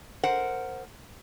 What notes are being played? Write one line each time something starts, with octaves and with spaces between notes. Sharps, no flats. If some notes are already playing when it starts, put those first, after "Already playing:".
A#4 C5 F#5